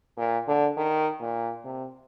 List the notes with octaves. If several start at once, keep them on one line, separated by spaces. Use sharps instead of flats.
A#2
D3
D#3
A#2
C3